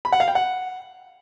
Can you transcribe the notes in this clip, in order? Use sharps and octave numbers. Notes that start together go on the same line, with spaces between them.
B5
F#5
F5
G5
F#5